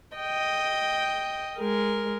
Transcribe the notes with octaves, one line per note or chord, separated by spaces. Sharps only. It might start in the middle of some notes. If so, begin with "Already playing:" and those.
D#5 G5
G#3 A#4